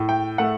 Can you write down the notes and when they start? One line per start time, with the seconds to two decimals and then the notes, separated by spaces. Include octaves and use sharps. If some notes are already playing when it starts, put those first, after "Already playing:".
Already playing: A2
0.09 G5
0.38 A3 F#5